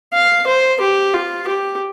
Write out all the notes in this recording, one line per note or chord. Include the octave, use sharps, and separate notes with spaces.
F5
C5
G4
F4
G4